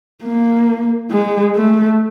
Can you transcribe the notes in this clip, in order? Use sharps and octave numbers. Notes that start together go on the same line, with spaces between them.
A#3
G#3
A3